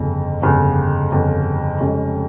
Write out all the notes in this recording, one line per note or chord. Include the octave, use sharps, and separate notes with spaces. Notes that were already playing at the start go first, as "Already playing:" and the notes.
Already playing: G1 F2 C#3
G1 F2 C#3
G1 F2 C#3
F1 F2 C#3 G#3 C#4